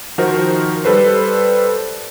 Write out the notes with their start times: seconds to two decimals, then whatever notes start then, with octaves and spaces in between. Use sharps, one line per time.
0.18 D#3 F3 D#4 F#4 A#4 C5
0.85 G3 A4 B4 C5